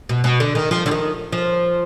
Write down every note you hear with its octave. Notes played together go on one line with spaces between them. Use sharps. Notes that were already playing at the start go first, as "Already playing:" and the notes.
B2
B2
D3
D#3
F3
D3
D#3
F3